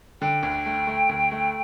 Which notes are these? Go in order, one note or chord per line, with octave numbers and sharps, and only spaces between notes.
D3 G5
D2
A3
A3
D2
A3